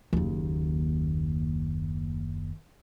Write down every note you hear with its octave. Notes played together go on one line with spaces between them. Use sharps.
F#1 D#2